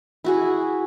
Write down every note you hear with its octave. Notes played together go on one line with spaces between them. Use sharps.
E4 F#4 G#4